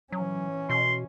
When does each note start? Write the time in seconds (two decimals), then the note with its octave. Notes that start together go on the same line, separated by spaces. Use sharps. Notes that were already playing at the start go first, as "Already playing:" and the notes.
0.12 E3 F#3 C#4
0.69 B2 C6